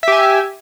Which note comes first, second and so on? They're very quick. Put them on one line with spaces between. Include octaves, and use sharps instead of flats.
E5 G4 G#5